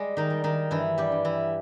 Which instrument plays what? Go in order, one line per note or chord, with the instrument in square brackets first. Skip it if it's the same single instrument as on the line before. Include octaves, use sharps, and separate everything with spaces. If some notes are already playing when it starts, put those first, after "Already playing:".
Already playing: [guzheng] G3 G#3
D#3 D#4
G3
D#3 D#4
G2 E3 E4
G3 G4
G2
E3 E4